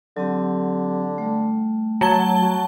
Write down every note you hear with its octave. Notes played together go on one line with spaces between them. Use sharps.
D3 F#3 C4 G4
G3 A3
F#3 F#4 A5 G7
F#4